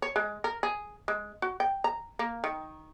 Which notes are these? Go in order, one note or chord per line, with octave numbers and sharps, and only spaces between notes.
C#5
G#3
A#4
G#4
G#3
F#4
G5
A#5
A#3
D#3